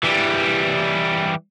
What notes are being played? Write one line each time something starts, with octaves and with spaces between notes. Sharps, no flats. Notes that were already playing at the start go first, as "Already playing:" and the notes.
E3 G3